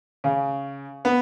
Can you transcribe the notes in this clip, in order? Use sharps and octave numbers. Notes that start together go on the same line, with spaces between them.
C#3
B3